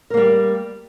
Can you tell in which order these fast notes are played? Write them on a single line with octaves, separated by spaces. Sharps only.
A#4 A#3 G3